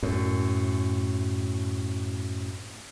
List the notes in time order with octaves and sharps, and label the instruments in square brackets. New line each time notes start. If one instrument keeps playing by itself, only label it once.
[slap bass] F#2 A2